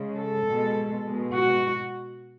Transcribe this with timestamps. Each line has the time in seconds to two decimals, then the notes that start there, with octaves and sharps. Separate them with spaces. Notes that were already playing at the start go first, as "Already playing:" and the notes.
Already playing: C#3 G#3
0.17 A4
0.46 B2 G#3
1.04 B2 G#3
1.32 F#4